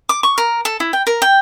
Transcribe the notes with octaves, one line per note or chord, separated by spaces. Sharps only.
D6
C#6
A#4
A4
E4
G5
A#4
G5